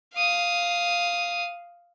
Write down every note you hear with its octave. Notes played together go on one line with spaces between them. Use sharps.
F5 D#6